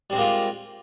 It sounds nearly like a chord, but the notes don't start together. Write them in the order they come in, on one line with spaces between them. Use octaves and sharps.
G3 C4 G#3 A#3 F4